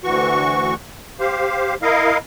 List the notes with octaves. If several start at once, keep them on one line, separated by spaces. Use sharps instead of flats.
D2 E3 F#4 C#6
G4 C5 F5
E4 A#4 D#5 F5